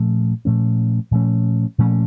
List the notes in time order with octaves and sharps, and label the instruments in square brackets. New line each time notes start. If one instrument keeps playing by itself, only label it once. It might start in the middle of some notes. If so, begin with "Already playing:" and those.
Already playing: [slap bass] A#2 F3 A3 C#4
A#2 F3 A3 C#4
A#2 F3 A3 C#4
A#2 F3 A3 C#4